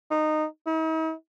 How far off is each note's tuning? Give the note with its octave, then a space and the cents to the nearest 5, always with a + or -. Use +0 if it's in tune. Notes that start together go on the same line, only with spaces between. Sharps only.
D#4 -15
D#4 +45